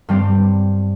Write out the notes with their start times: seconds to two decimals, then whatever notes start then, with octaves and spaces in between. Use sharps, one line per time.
0.09 G2 G3 C4 G4